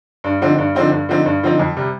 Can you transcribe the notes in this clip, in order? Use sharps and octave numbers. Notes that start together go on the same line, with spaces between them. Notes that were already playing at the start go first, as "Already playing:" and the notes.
G2
D3 F3 C4 D#4
G2
D3 F3 C4 D#4
G2
D3 F3 C4 D#4
G2
D3 F3 C4 D#4
F2
C3 G3